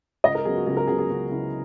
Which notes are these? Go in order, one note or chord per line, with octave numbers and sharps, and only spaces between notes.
C#2 D#5
A#4
C#3 F#3 B3 G#4
F#4
C#2 G#4
A#4
C#3 F#3 B3 G#4
G#4
C#2 F#4
C#3 F#3 B3 E4